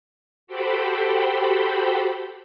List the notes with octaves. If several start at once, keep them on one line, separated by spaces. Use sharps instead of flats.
F#4 G4 A4 C5 G5 B5